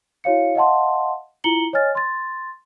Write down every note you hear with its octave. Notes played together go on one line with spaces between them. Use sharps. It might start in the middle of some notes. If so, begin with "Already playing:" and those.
E4 F#4 C#5 F5 C#7
D#5 F5 F#5 A5 C6
E4 F4 A#5 C#7 F#7 G7
C#5 D#5 G#5 F6 A6
C6 A6